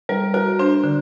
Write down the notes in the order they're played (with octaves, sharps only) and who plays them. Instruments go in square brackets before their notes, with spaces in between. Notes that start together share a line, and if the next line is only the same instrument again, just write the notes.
[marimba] G3 [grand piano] A#4
[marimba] F#4 [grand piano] A#4
[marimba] D4 [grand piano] C5
[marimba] D3